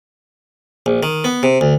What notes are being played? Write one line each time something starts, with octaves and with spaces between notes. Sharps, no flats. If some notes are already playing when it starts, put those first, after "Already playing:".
A#1
D#3
B3
C3
D2